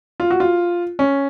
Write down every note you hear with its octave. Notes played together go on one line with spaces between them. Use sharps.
F4
F#4
F4
C#4